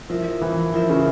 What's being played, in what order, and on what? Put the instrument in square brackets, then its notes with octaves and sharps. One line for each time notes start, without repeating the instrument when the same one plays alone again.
[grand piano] F3 [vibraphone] E4 A#4 E5
[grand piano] E3
[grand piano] F3 [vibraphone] E4 A#4 E5
[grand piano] C#3